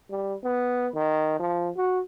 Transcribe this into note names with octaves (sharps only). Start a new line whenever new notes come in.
G3
B3
D#3
F3
F#4